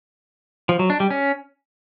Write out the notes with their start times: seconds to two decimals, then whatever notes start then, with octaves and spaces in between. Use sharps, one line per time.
0.69 F3
0.79 F#3
0.90 D4
1.00 G3
1.10 C#4